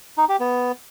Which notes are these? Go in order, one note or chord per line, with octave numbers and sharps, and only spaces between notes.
D#4
G4
B3